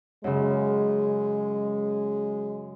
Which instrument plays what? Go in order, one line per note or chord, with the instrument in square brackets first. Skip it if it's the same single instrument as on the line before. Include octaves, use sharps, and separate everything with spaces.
[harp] F#2 C#3 [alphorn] G#3